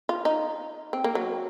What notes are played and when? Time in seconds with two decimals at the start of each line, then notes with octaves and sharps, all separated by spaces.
0.09 F4
0.25 D#4
0.93 C4
1.04 A#3
1.15 F#3